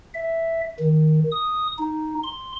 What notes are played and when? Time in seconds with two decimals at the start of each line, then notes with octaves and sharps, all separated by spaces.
0.15 E5
0.79 D#3
1.32 D#6
1.78 D#4
2.23 C6